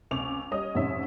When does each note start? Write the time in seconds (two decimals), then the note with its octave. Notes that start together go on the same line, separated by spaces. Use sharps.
0.11 C#2 C4 C#6 D6 F7
0.51 G3 C#4 D#5 D#6
0.75 A1 F2 G#2 C#3 C#4 E5